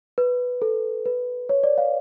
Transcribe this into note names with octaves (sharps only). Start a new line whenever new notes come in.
B4
A4
B4
C#5
D5
F5